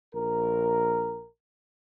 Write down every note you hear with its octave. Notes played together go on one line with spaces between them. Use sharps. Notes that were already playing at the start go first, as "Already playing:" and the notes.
A#1 A#4